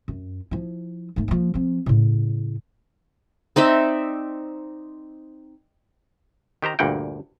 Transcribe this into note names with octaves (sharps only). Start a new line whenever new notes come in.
F#2
F3 E4
G#2 A3
F3 A#3
F3 C4
A2 C#3
C4 D#4 D5 E5
D#3 G4 C5 A#5
D2 G2 A#2 A#3 F#5 G5